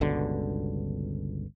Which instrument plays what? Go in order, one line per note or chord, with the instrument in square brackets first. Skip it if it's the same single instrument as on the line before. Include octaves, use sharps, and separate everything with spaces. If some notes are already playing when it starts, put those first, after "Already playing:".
[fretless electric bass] G1 C#2 B2 D3